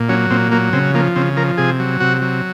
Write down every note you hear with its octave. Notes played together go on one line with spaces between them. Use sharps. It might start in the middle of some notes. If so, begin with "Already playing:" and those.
Already playing: A#2
F#3 C#4
A#2 C4
F#3 A#3
C#3 C4
F3 A#3
C#3 C4
F3 A#4
C3 G#4
F#3
C3 F#4
F#3